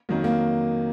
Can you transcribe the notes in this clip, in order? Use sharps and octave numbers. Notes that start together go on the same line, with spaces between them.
F2 D#3 F#3 A#3
A#3